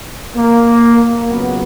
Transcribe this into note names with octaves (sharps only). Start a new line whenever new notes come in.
A#3
C#2 C#3 F#3 B3